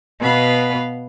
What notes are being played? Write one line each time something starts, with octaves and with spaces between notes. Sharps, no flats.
B2 B3 F5 B5